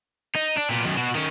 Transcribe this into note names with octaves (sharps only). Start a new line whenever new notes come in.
D#4
D4
A#2 B3
F#2 D#3
B2 F#4
D#3 C#4